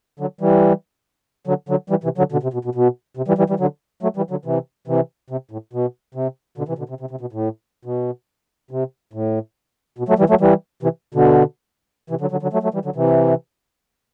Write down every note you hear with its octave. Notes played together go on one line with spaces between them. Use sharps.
D3 F#3
E3 G3
D3 F#3
D3 F#3
E3 G3
C3 E3
D3 F#3
B2 D3
C3
B2
B2
B2
C3
E3 G3
E3 G3
E3 G3
D3 F#3
F#3 A3
E3 G3
D3 F#3
C3 E3
C3 E3
C3
A2
B2
C3
B2 D3
C3 E3
B2 D3
C3
C3
C3
B2
A2
B2
C3
A2
B2
F#3 A3
E3 G3
F#3 A3
E3 G3
C3 E3
B2 D3
C3 E3
D3 F#3
D3 F#3
D3 F#3
F#3 A3
F#3 A3
E3 G3
D3 F#3
C3 E3